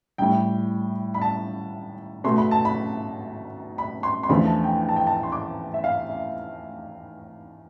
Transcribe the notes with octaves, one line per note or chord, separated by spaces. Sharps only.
A2 G3 G5
B5
A5
B2 A3 C6
B5
A5
B5
B5
C6
C6
E2 D3 F3 A3 B5
A5
G5
G5
A5
G5
A5
C6
D6
E5
F5
E5